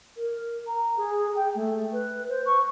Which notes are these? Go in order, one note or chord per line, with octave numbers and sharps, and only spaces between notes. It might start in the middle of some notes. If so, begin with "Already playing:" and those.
A#4
A#5
G#4
G5
A3
B4
C5
C#6